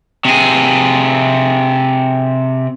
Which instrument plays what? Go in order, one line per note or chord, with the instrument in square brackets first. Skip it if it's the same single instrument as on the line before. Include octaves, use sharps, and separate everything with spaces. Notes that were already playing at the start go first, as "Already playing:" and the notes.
[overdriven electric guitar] C3 G#4